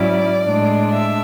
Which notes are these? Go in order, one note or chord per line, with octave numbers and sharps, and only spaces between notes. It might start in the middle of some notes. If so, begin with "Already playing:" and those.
Already playing: G#2 F#3 C#4 E4 D5
A2 G#3 D4
E5